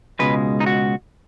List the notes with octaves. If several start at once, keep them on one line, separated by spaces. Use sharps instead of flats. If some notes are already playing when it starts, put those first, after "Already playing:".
C#2 B2 G#3 B4
D#4
F#4